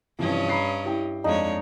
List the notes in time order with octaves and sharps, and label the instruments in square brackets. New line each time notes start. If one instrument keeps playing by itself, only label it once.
[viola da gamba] G2 C#4 D#5 [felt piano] C3 E3 F3
[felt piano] A#5 B5 C7
E4 G4 G5
[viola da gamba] F2 G#3 C#5 [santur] D4 D#4